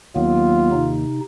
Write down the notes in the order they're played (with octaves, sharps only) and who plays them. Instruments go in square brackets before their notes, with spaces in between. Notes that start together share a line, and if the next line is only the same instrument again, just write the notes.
[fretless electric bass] D#2 [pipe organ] F#3 A#3 B3 [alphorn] F4
[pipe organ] C3 D#4